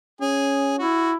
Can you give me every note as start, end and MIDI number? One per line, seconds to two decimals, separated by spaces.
0.21 0.83 61
0.21 0.74 68
0.78 1.15 64
0.78 1.12 66